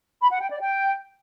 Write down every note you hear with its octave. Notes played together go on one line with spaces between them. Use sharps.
B5
F#5
G5
D5
G5